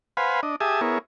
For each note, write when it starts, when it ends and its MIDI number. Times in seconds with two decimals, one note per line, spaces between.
0.17 0.41 71
0.17 0.41 72
0.17 0.41 77
0.17 0.41 78
0.17 0.41 80
0.17 0.41 83
0.43 0.56 62
0.43 0.56 75
0.61 0.81 67
0.61 0.81 68
0.61 0.81 76
0.61 0.81 80
0.61 0.81 81
0.61 0.81 87
0.81 0.98 59
0.81 0.98 64
0.81 0.98 68
0.81 0.98 70
0.81 0.98 73